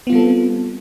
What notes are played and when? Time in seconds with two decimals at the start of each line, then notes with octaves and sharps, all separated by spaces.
0.07 B3
0.10 F4
0.12 G3
0.15 A4
0.18 C4